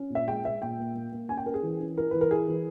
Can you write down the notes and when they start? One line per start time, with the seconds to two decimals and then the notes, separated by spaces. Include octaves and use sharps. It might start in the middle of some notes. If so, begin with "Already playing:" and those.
Already playing: C#4
0.10 A#2
0.15 E5
0.28 G#3 G5
0.44 G#3 E5
0.62 A#2 G5
0.79 A#3
0.95 A#3
1.12 A#3
1.29 C#4 G#5
1.37 G5
1.46 C#4 A#4
1.54 G#4
1.62 E3
1.80 C#4
1.97 E4 A#4
2.11 E3 B4
2.21 A#4
2.31 E4 G#4
2.48 E3